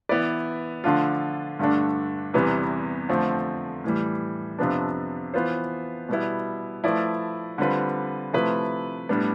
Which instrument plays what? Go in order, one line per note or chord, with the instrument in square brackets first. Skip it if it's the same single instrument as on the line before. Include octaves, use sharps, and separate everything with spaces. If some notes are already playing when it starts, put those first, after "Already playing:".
[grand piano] E3 B3 E4 B4 D5
D3 F3 A3 D4 F4
G2 D3 A3 D4
E2 C3 E3 G3 B3
F2 D3 F3 A3 C4
A2 E3 G3
F2 C3 F3 B3 D4
E3 B3 F4 C5
B2 G3 B3 E4
F3 A3 E4 B4 D5
D3 G3 C4 F4 B4
C3 F3 A3 E4 B4
A2 G3 B3 D4